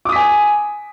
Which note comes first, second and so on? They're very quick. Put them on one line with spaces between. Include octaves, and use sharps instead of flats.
D6 D#6 B6 G#5